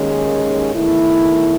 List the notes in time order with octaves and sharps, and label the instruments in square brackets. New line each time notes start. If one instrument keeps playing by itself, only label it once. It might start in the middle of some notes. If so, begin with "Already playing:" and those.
Already playing: [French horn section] D#2 D#3 G#3 C#4
E2 D#3 A3 E4